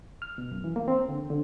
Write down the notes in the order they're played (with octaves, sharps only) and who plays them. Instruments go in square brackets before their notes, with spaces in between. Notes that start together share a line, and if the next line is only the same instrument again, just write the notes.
[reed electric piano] F6
B2
F#2
E3
A#3
C4
D3
D3